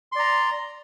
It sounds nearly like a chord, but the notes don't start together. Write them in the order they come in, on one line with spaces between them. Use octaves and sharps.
C6 D5 A#5